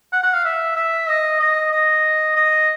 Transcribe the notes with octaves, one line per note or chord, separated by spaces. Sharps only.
F#5
F#5
F5
E5
E5
D#5
D#5
D#5
D#5